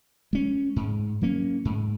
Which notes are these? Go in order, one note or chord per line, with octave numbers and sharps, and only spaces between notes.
G#3 C#4
G#2
F#3 A#3 C#4
G#2